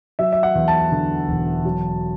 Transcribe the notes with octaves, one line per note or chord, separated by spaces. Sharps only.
F#3 E5
E5
F#5
E2
A5
D3
E1
F#3